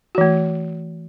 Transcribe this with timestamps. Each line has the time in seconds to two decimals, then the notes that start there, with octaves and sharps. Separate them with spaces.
0.15 F#4
0.18 E3
0.21 A3